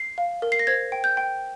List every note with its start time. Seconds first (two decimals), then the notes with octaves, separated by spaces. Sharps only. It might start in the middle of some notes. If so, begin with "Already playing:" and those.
Already playing: C7
0.18 F5
0.42 A#4
0.52 C7
0.59 A#6
0.67 C5 G#6
0.92 G5
1.04 G6
1.17 G5